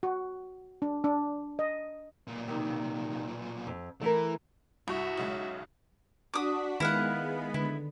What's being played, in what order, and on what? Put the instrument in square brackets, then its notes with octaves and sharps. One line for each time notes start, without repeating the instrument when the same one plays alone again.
[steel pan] F#4
D4
D4
D#5
[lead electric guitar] B1 A#2
[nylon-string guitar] C3 D#3
F2
[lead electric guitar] E3 [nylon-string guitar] A3 E4 A#4
[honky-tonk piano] C2 G2 C#6 [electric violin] F#4 E5
[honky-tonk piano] B1 C#3 G#3
[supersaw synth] D4 F#4 B6 [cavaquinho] D6 D#6
[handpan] D#3 B4 [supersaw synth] G#3 B3 B5 [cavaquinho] E4 F5 F#5
[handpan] D3 [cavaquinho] E4